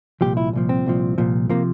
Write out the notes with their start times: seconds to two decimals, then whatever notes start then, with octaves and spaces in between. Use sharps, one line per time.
0.21 C2 A#2 F3 G4
0.37 E4
0.53 C2 A#2 F3
0.69 C4
0.86 C2 A#2 F3
1.18 C2 A#2 F3
1.49 C3 F3 A#3